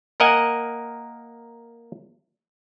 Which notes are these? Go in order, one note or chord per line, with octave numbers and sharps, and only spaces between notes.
A#3 A#4 D#5 F#5 G#5